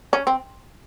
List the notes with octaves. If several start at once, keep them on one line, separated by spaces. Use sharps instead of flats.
C#4
C4